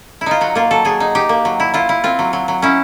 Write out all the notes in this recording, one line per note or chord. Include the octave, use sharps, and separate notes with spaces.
E4
D#4 F4
F#3 F#4
A#3 F4
F#3 A4
F#3 G#4
D#4
D#4 G4
A#3
F#3
E4
E4 F4
E4
C4 F4
F#3
F#3
F#3
C#4 E4